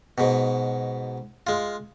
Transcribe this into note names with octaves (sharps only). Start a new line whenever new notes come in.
G#2 B2
G#3 F4